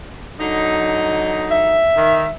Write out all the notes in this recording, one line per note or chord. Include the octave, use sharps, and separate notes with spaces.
D3 F#3 D#4
E5
D#3